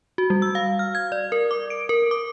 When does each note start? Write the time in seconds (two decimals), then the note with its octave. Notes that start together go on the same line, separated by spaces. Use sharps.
0.18 F#4
0.30 G3
0.42 E6
0.55 F5
0.79 F6
0.95 G#6
1.12 D5
1.32 A#4
1.51 D6
1.70 D7
1.89 A#4
2.11 D6